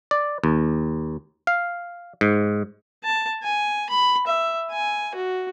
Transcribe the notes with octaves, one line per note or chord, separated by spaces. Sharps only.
D5
D#2
F5
G#2
A5
G#5
B5
E5
G#5
F#4